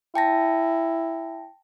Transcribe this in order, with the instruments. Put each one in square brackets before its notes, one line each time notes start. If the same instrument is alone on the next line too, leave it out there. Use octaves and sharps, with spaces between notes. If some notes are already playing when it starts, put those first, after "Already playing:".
[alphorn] E4 [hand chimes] G5 A5 A#6